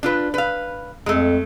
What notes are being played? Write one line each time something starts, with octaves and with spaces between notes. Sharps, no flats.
D4 F4 B4
B4 F5
F2 G#3 A3